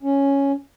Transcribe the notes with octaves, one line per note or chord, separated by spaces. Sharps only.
C#4